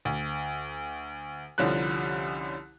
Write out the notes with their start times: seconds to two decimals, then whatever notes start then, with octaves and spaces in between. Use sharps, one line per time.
0.05 D2
1.58 C2 D3 F3 G3 C#4 F#6